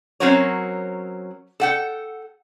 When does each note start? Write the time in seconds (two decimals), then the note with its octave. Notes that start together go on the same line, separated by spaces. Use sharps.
0.20 F#3 C4 C#4 F#4 A#4 C#5
1.60 A4 F#5 G5